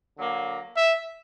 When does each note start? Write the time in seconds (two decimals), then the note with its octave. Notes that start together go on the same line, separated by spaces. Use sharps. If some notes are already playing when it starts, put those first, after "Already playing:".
0.17 D3 F#3 A#3
0.77 E5